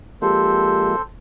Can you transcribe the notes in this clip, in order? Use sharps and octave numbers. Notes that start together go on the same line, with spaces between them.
F3 G#3 A#3 C4 G4 A4 C5